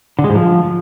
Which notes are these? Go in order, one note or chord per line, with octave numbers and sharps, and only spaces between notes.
D3
G#3
G#2
F3